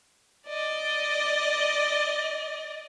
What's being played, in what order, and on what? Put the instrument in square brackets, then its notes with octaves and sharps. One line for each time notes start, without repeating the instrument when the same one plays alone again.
[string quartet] D5 D#5